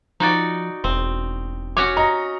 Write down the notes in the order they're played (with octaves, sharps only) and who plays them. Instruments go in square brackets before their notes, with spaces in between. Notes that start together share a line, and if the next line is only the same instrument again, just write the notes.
[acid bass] F3 [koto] D#4 F#4 D5
[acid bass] E1 [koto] C4
[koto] C#4 F#4 C#5 [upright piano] D6
[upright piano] D#5 A#5